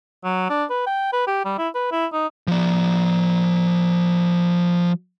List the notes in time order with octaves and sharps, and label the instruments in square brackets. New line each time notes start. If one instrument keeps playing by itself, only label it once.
[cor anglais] F#3
D4
B4
G5
B4
G4
G3
E4
B4
E4
D#4
[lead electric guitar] F3 D5